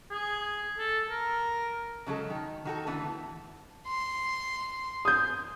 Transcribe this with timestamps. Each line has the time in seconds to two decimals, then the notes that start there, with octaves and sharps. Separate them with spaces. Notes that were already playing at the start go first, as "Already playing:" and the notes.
0.11 G#4
0.78 A4
1.10 A#4
2.06 C#3 F#3 G#3 A4
2.30 D#3
2.65 D#3 F#4 A4
2.87 D3 E3 A3 B3
3.88 C6
5.05 D#6 G6